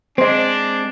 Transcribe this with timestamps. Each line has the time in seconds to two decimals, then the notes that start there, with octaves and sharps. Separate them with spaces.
0.18 G#3 C4 D4 C5 D#5